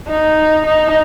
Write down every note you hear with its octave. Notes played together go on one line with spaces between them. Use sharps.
D#4
D#4